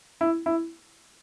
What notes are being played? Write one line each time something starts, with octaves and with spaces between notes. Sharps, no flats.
E4
E4